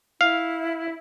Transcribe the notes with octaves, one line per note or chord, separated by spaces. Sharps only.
E4 F5